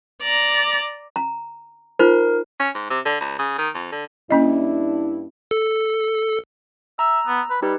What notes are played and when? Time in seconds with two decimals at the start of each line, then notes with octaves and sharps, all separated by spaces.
0.22 D5 A#5
1.16 A#5
1.99 D#4 F4 A#4 C5
2.59 C#4
2.75 G#2
2.90 C3
3.05 D3
3.20 C#2
3.39 C#3
3.58 D#3
3.74 F2
3.92 D3
4.31 G2 A#3 C#4 D4 E4 D#5
5.51 A4
6.99 E5 A#5 E6
7.26 B3
7.50 B4
7.62 G3 D#4 G4 B4